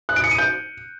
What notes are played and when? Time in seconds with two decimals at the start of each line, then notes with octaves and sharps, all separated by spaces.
0.09 F#6
0.16 D7
0.24 C#7
0.31 D#7
0.38 G6